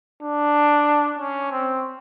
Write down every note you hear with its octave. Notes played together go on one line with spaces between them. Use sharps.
D4
C#4
C4